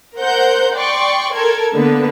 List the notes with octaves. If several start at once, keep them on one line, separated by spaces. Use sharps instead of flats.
A#4 C5 F#5 G6
D5 G5 C6 C#6
A4 A#4 G#6
D3 A#3 B3 B4